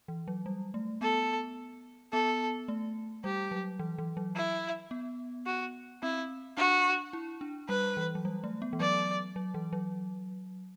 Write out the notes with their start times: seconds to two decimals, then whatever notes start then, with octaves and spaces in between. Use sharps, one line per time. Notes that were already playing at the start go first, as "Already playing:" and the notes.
0.08 E3
0.28 F#3
0.46 G3
0.74 A3
1.01 B3 A4
2.12 B3 A4
2.68 A3
3.24 G3 G4
3.51 F#3
3.79 E3
3.98 E3
4.17 F#3
4.35 E4
4.91 B3
5.46 F#4
6.02 C4 E4
6.57 D4 F#4
7.13 E4
7.41 D4
7.69 G3 B4
7.97 E3
8.15 F#3
8.25 G3
8.44 A3
8.62 B3
8.73 E3
8.80 F#3 D5
9.36 F#3
9.54 E3
9.73 F#3